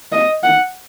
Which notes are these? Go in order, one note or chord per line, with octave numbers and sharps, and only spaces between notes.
D#5
F#5